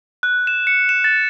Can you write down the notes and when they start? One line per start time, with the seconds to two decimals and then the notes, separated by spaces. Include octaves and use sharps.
0.23 F#6
0.47 E7
0.67 C#7
0.89 E7
1.04 A6